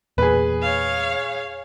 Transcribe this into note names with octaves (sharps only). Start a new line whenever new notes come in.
E2 A#2 G#4 B4
C#5 F5